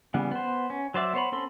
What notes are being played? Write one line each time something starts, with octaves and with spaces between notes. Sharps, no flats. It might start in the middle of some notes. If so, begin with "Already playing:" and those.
C#3 E3 G3 B3
B3 C5
C#4
F#3 C5 D5 E5
B3 C5 C#5 B5
C4 C#4 A4 B5 C6